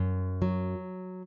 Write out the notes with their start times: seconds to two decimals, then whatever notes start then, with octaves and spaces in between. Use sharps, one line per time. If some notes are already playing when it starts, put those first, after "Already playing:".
Already playing: F#2
0.42 F#3